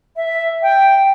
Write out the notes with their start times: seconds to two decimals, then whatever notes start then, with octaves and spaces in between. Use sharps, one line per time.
0.16 E5
0.62 G5